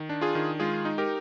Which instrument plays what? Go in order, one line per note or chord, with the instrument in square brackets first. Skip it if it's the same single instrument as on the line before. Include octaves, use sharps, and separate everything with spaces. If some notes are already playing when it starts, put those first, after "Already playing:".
Already playing: [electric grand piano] D#3
D4
F4 G#4
D#3
G#3 F4 G#4
D#4
G4 A#4